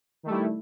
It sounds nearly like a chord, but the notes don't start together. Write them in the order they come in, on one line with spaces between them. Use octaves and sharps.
D#3 A3 G3 E4